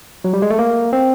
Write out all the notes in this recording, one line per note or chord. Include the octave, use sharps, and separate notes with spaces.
F#3
G3
G#3
A3
A#3
C4